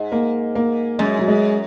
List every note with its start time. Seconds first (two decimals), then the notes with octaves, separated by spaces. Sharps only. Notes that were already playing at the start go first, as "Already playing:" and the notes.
Already playing: G#2
0.12 A#3
0.55 A#3
0.99 F#2 G#3
1.19 F#3
1.28 G#3